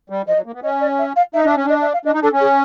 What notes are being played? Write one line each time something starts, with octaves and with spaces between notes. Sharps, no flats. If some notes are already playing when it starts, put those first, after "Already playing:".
G3
F3 D#5
F#3
A#3
B3
C#4 D#5
D5
E5
F5
D#4 E5
D#5
D4 E5
C#4
D4 D#5
E5
F5
D4 D#5
D#4
D4 A4
C#4
G#4